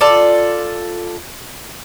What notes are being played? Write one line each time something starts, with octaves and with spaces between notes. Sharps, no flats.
F4 A4 D5